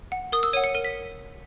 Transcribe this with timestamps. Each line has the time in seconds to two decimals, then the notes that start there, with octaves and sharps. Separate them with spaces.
0.12 F#5
0.32 A#4 D#6
0.43 E6
0.53 C#5 D#7
0.57 F#5
0.64 C#7
0.74 A#4 D#7
0.85 B6